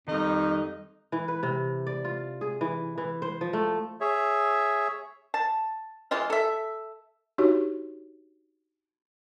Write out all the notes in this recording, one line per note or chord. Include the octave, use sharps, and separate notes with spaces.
F2 D#3 G3 D#4
E3
B4
C3
D5
F4
G#4
E3
E3
C5
F3
A3
G#4 C#5 E5
A5
E3 G#3 F4 D#5
A4 E5
D4 D#4 F#4 G4 C#5